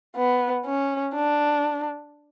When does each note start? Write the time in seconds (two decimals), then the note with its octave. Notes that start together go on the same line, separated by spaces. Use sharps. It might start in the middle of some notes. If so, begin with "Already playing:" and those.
0.16 B3
0.66 C#4
1.15 D4